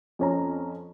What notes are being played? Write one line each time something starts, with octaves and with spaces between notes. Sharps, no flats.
F2 C#4 A#5